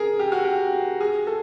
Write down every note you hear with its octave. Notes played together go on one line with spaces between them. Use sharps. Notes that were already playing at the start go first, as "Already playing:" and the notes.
Already playing: G#4 A#4
G4
F#4
G4
G#4
A4